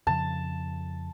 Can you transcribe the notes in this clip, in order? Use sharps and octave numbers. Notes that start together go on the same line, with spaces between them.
F2 C#3 F3 A5